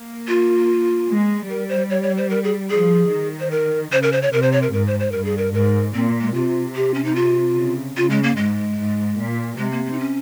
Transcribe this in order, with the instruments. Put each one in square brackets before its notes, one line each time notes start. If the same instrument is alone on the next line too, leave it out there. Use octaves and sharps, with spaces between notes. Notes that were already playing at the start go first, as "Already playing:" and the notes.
Already playing: [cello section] A#3
[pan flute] F4
[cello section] G#3
[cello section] G3 [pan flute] A#4
[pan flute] C5
C#5
C#5
C5
A#4
G#4
[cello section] F3 [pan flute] G#4
[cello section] D#3
[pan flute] C5
A#4
[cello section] C#3 [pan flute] C5
[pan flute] A#4
C5
C#5
[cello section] C3 [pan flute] A#4
[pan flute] C5
C#5
A#4
[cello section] G#2 [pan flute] A#4
[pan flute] C5
C5
[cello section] G2 [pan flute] A#4
[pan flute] G#4
A#4
[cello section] G#2 [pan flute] A#4
[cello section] A#2 [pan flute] C4
[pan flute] G#3
[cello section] C3 [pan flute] F4
[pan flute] G4
C#4
D#4
F4
[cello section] C#3
[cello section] C#3 [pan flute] F4
[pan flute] G#3
A#3
[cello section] G#2 [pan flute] G#3
[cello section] G#2
A#2
[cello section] C3 [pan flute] G#3
[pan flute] A#3
A#3
D#4
C#4